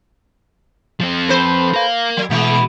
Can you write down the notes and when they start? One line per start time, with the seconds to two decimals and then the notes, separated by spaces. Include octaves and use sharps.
1.00 F3 C4
1.28 A4 B4 C5
1.74 A#4 F5
2.17 F#3
2.30 B2 E3 G#3 B3